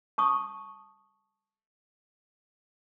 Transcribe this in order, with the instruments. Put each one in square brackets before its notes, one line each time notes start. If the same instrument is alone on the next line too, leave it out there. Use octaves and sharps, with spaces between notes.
[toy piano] A5 C#6 D#6